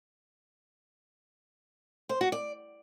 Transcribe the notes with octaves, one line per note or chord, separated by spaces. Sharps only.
C5
F#4
D5